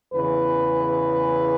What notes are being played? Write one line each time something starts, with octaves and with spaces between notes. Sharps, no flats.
E2 C#3 E3 B4